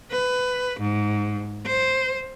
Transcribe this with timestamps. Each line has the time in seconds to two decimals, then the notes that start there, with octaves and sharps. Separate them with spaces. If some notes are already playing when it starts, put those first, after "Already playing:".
0.11 B4
0.80 G#2
1.66 C5